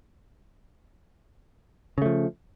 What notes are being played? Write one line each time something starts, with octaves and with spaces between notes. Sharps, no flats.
C#3 F3 A3